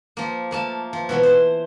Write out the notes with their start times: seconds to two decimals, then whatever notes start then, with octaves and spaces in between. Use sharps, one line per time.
0.17 F3 A#3
0.51 A3 A#3 A5
0.93 F3
1.09 B2 E3 B3
1.23 C5